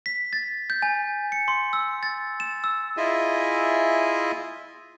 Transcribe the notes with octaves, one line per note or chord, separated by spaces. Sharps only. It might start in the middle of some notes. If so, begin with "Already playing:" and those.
B6
A6
G6
G#5
C#7
C6
E6
A6
E7
E6
E4 F4 G#4 D#5 E5 G#5